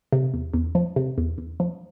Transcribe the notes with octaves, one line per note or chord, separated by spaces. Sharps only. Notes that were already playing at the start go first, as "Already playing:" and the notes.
C3
E2
E2
F3
C3
E2
E2
F3